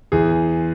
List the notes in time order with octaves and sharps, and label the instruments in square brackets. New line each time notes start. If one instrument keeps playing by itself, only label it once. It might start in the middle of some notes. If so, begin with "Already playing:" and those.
[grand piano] E2 G#4